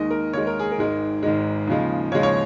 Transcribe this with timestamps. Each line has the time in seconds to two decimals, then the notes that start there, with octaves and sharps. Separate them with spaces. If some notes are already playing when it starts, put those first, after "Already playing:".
Already playing: D#2 D#3 G#3 D#5
0.11 A#4
0.33 D#2 D#3 G#3 C#5
0.47 A#4
0.59 G#4
0.72 A#4
0.77 G#1 G#2 D#3 G#3
1.23 G#1 G#2 D#3 G#3
1.67 D#2 C#3 F3 G#3
2.12 D#2 C#3 F3 G#3 C#5
2.23 C#5